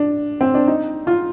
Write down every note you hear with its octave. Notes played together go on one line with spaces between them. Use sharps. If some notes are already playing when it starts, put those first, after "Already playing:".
Already playing: D4
C4
D4
D#4
F4